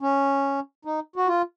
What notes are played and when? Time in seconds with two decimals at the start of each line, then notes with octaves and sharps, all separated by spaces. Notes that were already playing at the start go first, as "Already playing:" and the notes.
0.01 C#4
0.85 D#4
1.16 F#4
1.27 F4